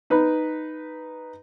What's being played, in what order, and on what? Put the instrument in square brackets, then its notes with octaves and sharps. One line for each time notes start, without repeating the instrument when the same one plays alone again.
[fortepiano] D#4 B4 B5 F#6